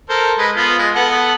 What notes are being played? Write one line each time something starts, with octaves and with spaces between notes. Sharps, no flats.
A4 A#4 C5
G#3 B4
B3 F4
G#3
B3 A4 F#5